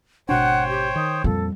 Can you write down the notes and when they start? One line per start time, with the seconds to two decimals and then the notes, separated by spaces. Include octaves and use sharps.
0.29 G#1 B2 D4 C5 C#5 F#5 G5
0.69 G4
0.96 D#3 D#6
1.24 F2 A#2 F3 G3 A4